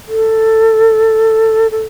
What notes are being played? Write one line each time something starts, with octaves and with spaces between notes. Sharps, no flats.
A4
A4